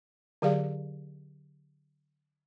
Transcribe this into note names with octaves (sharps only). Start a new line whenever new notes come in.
D3 F#3 G4 G#4 D5 F5